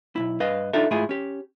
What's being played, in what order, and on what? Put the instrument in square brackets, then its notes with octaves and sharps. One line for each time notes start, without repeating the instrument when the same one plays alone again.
[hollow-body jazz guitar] B1 F#2 E4
G2 B4 D#5 F5
D4 D#4 F4 A4 E5
G#2 A3 E4 F4 G#4
C#4 G4